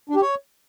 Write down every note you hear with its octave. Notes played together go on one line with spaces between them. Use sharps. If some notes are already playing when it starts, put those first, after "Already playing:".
D4
G4
C#5